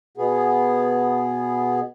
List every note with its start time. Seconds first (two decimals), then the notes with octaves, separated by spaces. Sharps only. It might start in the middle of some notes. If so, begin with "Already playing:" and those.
0.17 B2 B3 G#4